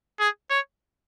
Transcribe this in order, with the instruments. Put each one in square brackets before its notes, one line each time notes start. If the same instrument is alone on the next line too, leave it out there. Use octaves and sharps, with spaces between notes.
[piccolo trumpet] G#4
C#5